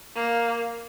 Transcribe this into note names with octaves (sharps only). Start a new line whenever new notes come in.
A#3